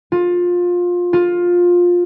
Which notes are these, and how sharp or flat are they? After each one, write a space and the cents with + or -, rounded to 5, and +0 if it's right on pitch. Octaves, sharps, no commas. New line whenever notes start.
F4 +20
F4 +15